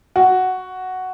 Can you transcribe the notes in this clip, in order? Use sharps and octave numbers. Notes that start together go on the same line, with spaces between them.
F#4